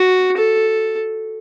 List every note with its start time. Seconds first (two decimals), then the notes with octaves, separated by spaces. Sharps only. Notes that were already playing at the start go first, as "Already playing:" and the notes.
Already playing: F#4
0.37 A4